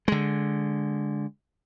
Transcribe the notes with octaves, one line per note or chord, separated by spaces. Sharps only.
D3 G#3